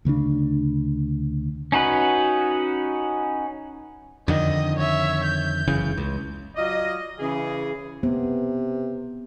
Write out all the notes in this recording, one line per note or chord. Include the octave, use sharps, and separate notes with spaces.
D2 C#3 A3 D4
C#4 D#4 F#4 B4
F2 D3 D#3 D#5
C#5 E5
G6
F#1 C#3 E3
C#2
F#3 F4 D5 D#5
C#3 E3 G#4
C3 B3